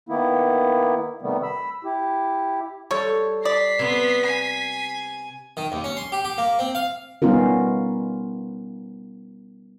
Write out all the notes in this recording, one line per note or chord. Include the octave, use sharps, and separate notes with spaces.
D#3 A#3 B3 E4
C3 D#3 G3 A3 B3
B5 E6
E4 G4
G3 A4 C#5
D5 B6 C7
C3 B3 C6
G#5
D#3
D#2
C#4
C6
G4
G4
A#3
C4
F5
G3 B3 C#4 D#4 F4 A#4